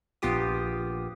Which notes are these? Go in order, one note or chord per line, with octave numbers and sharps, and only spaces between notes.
A#1 B3 F4 G4 D#6